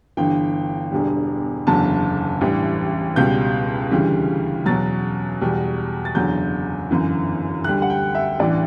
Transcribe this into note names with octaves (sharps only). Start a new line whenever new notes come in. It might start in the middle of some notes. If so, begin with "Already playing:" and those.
G1 G2 E3 G5
E1 E2 D3 G3
F#1 E2 D3 F#3 A5
A1 G2 E3 G3
C#2 B2 G3 G6
D2 C#3 E3 G3
E2 B2 F#3 A6
E2 B2 G3
A6
F#1 E2 D3 F#3 G6
G1 F#2 E3
D2 D3 G3 F#6
F#5
G5
E5
A1 G2 E3 D5